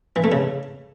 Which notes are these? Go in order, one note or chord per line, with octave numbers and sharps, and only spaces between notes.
E3
A3
C#3